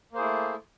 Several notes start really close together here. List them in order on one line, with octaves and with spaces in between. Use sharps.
A#3 C5 G#4 E4 A3